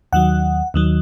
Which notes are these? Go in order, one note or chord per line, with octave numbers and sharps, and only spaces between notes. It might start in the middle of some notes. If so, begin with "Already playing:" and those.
D#2 D#3 F#3 F#5
D#2 D#3 F#3